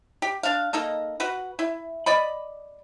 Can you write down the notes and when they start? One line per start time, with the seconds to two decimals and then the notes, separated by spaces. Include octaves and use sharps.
0.22 G4
0.43 D4 F5
0.73 A#3 D#4 A4 D#5
1.20 F#4 B4 F#5
1.59 E4
2.06 D5 D#5 B5